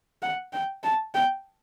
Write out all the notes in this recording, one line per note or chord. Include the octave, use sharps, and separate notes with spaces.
F#5
G5
A5
G5